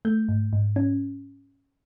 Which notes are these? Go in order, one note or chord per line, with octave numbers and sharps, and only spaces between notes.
A3 G6
G#2
G#2
C#4